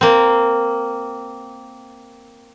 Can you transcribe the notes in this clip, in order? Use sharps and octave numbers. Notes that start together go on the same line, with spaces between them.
A#3 C4